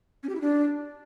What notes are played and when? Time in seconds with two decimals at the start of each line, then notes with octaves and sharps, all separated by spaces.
0.23 C#4
0.29 G4
0.35 E4
0.41 D4